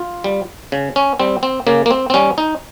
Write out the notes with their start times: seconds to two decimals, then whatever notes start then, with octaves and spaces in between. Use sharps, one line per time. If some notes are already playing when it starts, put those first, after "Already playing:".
Already playing: F4
0.24 G3
0.72 C#3
0.96 C#4
1.19 G3 C4
1.43 C4
1.67 C#3 A#3
1.86 A#3
1.91 C4
2.10 C4
2.14 G3 C#4
2.38 D#4